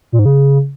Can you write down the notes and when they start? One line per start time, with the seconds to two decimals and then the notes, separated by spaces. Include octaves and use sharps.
0.12 A#2
0.19 G#2
0.25 C#3